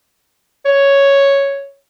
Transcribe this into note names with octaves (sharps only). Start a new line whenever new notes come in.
C#5